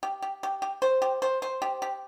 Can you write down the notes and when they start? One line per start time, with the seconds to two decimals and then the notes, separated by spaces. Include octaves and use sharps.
0.03 G4
0.22 G4
0.43 G4
0.62 G4
0.82 C5
1.02 G4
1.22 C5
1.42 C5
1.62 G4
1.82 G4